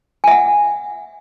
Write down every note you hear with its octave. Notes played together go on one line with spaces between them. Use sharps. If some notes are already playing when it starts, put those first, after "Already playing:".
E5 F#5 G#5